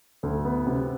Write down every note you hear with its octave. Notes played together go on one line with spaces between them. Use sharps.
D2
B3
C3